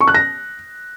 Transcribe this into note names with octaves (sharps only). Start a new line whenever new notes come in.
C#6
F#6
A#6